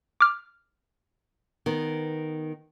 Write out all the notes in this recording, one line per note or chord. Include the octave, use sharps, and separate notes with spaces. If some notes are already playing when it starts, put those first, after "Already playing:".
D6 F6
D#3 B3